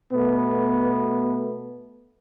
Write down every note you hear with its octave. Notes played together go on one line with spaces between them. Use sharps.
B2 A3 B3